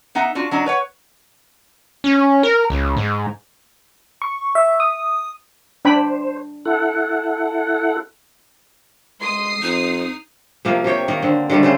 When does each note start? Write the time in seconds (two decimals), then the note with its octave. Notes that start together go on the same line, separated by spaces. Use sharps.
0.15 B3 D#4 E5 F#5
0.35 D4 F4 F#4
0.51 F#3 D4 D#4
0.66 B4 C#5 F#5
2.04 C#4
2.43 A#4
2.70 C#2
2.97 G#2
4.22 C#6
4.55 E5
4.80 D#6
5.85 D4 C5 G5 B5
6.65 E4 A4 F#5
9.20 G#3 C6 D#6 C7
9.62 F2 C4 D#4
10.65 C3 F3 A#3
10.84 C3 G4 C#5 G5
11.08 D#3 A#3 D#5
11.22 D3 C4
11.50 D3 D#3 G3 A3
11.63 C#3 A3 C5